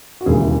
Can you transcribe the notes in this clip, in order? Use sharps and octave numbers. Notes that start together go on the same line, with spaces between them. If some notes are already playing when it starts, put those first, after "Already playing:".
F#4
E1 D#2 C#3 E3 G#4
E4